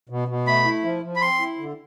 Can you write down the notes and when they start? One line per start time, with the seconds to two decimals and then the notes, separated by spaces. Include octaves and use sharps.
0.09 B2
0.28 B2
0.47 A3 B5
0.65 E4
0.84 F3
1.03 F3
1.16 B5
1.21 C4 C6
1.39 E4
1.58 D3